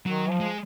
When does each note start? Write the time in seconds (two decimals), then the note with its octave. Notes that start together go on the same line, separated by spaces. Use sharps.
0.06 D#3 F#3
0.29 F3
0.40 G#3